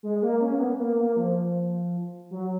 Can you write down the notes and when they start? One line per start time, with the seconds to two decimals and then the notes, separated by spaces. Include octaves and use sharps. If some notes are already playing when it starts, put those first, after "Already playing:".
0.03 G#3
0.22 A#3
0.41 C#4
0.55 A#3
0.60 B3
0.79 A#3
0.98 A#3
1.17 F3
2.31 F#3